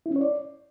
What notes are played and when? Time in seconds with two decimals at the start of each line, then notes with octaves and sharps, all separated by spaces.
0.06 E4
0.11 C#4
0.16 C#5
0.21 D5